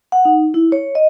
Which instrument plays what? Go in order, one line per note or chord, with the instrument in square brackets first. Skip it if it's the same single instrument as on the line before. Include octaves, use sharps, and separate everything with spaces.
[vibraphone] F#5
D#4
E4
C#5
D#5